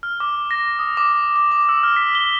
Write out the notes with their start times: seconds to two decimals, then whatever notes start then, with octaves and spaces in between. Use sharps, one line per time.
0.03 F6
0.20 D6
0.51 A#6
0.79 D#6
0.97 D6
1.36 D6
1.52 D6
1.69 E6
1.83 F6
1.96 B6
2.15 G7